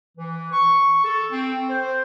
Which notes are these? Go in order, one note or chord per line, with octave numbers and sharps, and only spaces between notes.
E3
C#6
A4
C4
C5